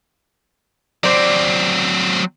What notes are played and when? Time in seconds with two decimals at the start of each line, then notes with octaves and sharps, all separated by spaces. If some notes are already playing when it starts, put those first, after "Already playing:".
1.04 F#3 C4 C5 D5